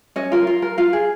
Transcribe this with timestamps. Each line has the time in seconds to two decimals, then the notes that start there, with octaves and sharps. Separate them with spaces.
0.16 C#4 D#5
0.32 F4 A#4
0.47 F4
0.62 A#4
0.78 F4 F5
0.93 G#4